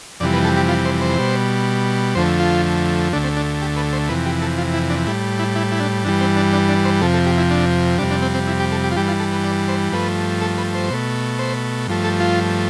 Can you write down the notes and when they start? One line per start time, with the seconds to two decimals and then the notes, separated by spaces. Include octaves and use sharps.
0.20 F2 C3 E3 G3 D5
0.33 B4
0.44 A4
0.57 G4
0.69 F4
0.86 C5
1.01 C5
1.18 B2 G3
2.15 F2 D3 F3 A3 C5
2.40 F4
3.13 D2 D3 A3 D4
3.24 C4
3.37 D4
3.62 G4
3.77 B4
3.93 C5
4.09 F2 C3 E3 B4
4.26 G4
4.42 A4
4.58 F4
4.74 E4
4.90 D4
5.07 A2 G3 E4
5.39 E4
5.56 E4
5.72 E4
5.80 D4
6.04 G2 E3 G3 D4
6.21 C4
6.36 D4
6.53 D4
6.69 D4
6.85 C5
7.02 F2 C3 F3 A4
7.14 A4
7.26 G4
7.38 E4
7.51 D4
7.98 F2 C3 G3 D4
8.11 D4
8.22 C4
8.34 C4
8.47 E4
8.60 G4
8.72 A4
8.84 G4
8.91 F4
8.96 G2 E3 G3 G4
9.08 F4
9.20 A4
9.32 B4
9.44 D5
9.68 C5
9.93 G2 F3 A3 B4
10.41 A4
10.58 B4
10.75 C5
10.90 B2 A3
11.39 C5
11.88 G2 F3 A3
12.04 A4
12.20 F4